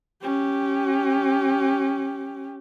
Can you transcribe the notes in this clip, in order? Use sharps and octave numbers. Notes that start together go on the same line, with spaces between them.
C#4 G4